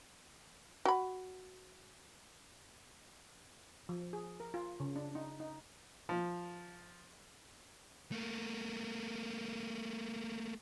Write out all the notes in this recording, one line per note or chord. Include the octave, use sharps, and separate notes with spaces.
F#4 B5
F3
G#4
A#4
F4
C#3
D4
D#4
D#4
F3
A3 A#3